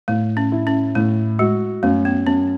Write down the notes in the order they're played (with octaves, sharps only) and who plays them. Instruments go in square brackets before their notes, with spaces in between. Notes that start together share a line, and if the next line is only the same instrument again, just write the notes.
[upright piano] A2 [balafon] A3
[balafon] C#4
[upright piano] E4
[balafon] C#4
[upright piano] A2 [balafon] A3
[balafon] G#3 [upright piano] F#4
[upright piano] F#2 [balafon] A3
[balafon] B3
[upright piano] F#2 [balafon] C#4